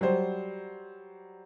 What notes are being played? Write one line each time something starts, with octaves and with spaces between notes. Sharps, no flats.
F#3 G3 C5